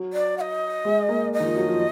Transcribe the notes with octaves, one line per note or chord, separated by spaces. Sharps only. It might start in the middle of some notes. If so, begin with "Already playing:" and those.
Already playing: F#3
D5
F#5
D#5
G#3
A#3
D#5
D#3
F3
F#3
F3